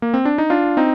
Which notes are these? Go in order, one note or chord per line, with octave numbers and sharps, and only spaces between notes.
A#3
C4
D4
D#4
D4 F4
C4 D#4